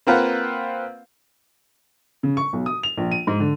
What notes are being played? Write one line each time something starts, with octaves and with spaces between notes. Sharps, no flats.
A#3 C4 F4 B4 F5 F#5
C#3
C#6
B1
D#6
F7
A#1
D#7
G#2
D3